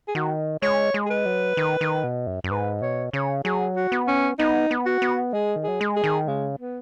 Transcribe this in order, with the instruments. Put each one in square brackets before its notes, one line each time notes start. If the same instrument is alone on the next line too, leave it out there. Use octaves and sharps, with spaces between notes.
[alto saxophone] G#4
[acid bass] D#3 [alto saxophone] F#4
[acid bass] G#3 [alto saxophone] C#5
[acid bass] G#3
[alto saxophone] G#4
B4
[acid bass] F#3
D#3
D#3
B2
F#2
F#2
[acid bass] G#2 [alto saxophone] B4
[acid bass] B2 [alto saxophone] C#5
[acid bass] C#3 [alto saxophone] C#5
[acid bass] F#3 [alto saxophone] G#4
[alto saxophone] F#4
[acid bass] B3
[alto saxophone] C#4
[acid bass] B3 [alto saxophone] D#4
[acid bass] B3
[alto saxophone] F#4
[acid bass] B3
[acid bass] G#3 [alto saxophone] G#4
[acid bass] D#3
[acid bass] F#3 [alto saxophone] G#4
[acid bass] G#3
[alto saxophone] G#4
[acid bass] D#3
[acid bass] C#3 [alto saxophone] G#3
[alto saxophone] B3